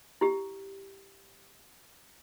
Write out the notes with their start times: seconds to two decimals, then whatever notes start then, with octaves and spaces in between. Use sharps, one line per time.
0.21 E4 G4